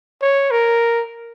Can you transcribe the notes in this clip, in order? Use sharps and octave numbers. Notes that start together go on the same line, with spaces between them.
C#5
A#4